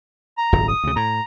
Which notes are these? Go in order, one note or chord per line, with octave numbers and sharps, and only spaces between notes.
A#5
D#1 G#1 F#2
D#6
D2 C#3
A2 A#5